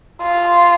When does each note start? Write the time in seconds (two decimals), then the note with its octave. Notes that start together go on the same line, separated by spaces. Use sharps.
0.23 F4